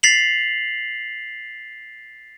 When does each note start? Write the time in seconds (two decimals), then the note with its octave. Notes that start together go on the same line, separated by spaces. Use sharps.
0.03 A6 B6 C7 F7 F#7